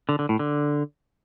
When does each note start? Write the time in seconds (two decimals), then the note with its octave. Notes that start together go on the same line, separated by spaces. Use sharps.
0.09 D3
0.19 D3
0.29 A2
0.39 D3